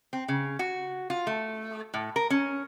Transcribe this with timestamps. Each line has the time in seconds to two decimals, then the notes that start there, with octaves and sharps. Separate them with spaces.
0.13 C4
0.28 C#3
0.59 F#4
1.10 F4
1.27 A3
1.94 A2
2.16 A#4
2.30 C#4